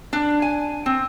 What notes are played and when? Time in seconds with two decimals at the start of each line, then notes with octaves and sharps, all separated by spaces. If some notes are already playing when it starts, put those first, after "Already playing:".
0.13 D4
0.42 G#5
0.86 C4